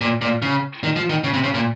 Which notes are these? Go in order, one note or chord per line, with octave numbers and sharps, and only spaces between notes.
A#2
A#2
C#3
D#3
F3
D#3
C#3
C3
C#3
A#2